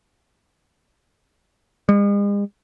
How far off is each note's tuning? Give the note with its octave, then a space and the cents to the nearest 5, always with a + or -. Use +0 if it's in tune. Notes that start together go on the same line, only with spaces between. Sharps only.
G#3 -45